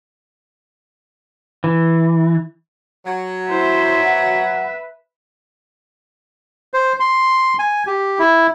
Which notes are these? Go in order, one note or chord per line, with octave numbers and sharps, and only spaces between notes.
E3
F#3
E4 C5 E5
B4 F#5
C5
C6
G#5
G4
E4